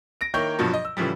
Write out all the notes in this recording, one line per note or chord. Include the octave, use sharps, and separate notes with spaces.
A#6 D7
D#3 A#3 E4 C#5 G5 G6
G2 B2 F3 F#3
D#5
E6
A2 C#3 E3 F3 G3